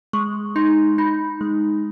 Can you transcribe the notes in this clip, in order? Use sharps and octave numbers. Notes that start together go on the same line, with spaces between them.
G#3 C#6
D#4 C6
D#4 B5
G#3